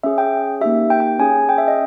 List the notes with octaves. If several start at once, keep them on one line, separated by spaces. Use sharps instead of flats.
C#4 G#4 E5
G5
A#3 D#4 G4 E5
G5
G5
C#4 G#4 G#5
G5
E5
D#5